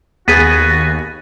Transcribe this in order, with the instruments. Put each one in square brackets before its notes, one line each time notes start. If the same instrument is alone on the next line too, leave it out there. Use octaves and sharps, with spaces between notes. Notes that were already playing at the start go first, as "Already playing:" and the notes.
[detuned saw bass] D#2 [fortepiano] B3 G#4 [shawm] F#4 [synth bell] A6 B6 D#7